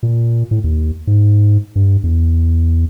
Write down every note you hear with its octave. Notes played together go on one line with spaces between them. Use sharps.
A#2
A2
D#2
G#2
G2
E2